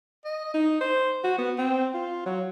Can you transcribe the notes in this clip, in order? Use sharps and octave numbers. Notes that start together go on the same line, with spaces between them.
D#5
D#4
C5
F#4
B3
C4
F4
F#3